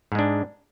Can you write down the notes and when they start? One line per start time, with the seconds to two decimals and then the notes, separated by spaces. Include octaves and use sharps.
0.12 G#2
0.15 G#3
0.19 D4